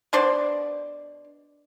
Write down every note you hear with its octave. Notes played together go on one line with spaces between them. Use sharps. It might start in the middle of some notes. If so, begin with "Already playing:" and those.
B2 D4 C5 D5